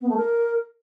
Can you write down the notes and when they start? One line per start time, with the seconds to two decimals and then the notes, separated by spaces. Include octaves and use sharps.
0.01 B3
0.09 A3
0.17 A#4